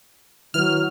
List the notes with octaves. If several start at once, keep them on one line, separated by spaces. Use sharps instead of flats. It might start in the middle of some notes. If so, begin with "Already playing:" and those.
D#3 F#3 E4 B4 F6